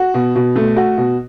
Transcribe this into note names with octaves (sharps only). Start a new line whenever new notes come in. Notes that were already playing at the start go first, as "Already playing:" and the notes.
Already playing: F#4
B2
B2
A3
F#4
B2